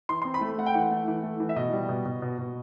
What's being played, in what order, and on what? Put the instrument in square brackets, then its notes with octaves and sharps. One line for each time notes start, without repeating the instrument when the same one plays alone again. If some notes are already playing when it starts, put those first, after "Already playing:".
[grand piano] E3 C6
C4 C6
B5
A3
A3 F#5
G5
E3 F#5
A3
E3
A3
E3
E5
B2 D#5
G3
B2
B2
B2
B2